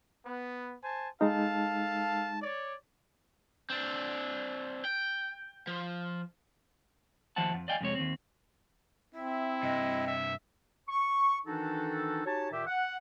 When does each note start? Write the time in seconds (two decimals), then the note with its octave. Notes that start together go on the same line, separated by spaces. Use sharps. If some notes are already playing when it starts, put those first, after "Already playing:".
0.26 B3
0.83 C5 G#5 A5
1.21 G#3 D#4 A4 F5 A5
2.41 C#5 D5
3.70 C4 D4
4.85 G5
5.67 F3
7.36 D#2 F3 C5 E5 F#5 A5
7.53 F2
7.68 D5 D#5 F5 G5 G#5
7.80 F2 C3 G#3 C#5
7.95 D#2 C4
9.15 C4 E4 E5
9.63 G2 C3 D#5
10.07 E5
10.89 C#6
11.46 D#3 E3 D4 D#4 F#4 A4
12.26 D#4 F#4 G4 C#5 G#5 A5
12.52 A#2 D#3 G4 E5
12.67 F#5